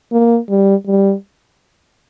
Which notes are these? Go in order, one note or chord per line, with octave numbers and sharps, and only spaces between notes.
A#3
G3
G3